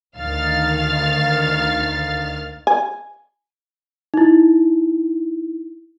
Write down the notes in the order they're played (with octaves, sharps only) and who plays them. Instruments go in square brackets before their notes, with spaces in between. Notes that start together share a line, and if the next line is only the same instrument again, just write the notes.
[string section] D2 D#3 F5 F6 A6
[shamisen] G#5
[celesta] D#4 E4